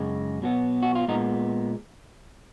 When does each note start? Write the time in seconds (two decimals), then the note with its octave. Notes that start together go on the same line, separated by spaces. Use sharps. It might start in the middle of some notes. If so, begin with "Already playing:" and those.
Already playing: F#2 C#3 G#3
0.42 B2 F#3 B3
0.82 F#4
0.95 F4
1.08 A#2 G#3 B3 D#4